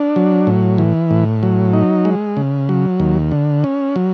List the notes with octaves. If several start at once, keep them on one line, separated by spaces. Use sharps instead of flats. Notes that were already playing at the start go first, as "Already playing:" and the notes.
Already playing: D4
F#3
A2
E3
A2
F#3
D#4
G#3
C#3
F#3
D#2
D3
C#4
F#3